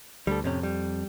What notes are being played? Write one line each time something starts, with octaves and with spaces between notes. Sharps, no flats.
D2 G3 A4
F2 A2 C3 C#4
G3